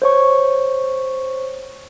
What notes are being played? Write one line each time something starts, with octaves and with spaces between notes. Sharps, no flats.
C5 C#5 C#6